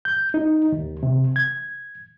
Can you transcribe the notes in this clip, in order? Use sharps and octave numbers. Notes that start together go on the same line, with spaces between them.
G6
D#4
D#2
C3
G#6